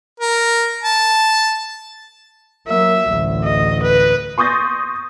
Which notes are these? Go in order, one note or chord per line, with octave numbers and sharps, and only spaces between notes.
A#4
A5
F#3 A#3 E5
A1 D2
D#5
B4
C6 C#6 D#6 G6 A6 A#6